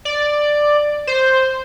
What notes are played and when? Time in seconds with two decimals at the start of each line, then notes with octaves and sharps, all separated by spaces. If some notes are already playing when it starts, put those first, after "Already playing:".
0.05 D5
1.07 C5